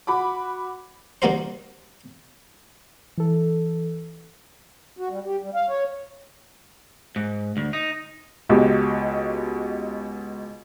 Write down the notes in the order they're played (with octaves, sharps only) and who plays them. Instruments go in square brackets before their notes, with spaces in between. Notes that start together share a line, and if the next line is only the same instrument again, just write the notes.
[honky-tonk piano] F#4 B5 D6
[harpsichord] D#3 G3 A#3 F#4 A#4 C5
[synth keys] E3 A4
[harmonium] F#4
G3
G4
G3
F5
C#5
[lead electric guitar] G#2
D2
D#4
[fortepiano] C#2 B2 G4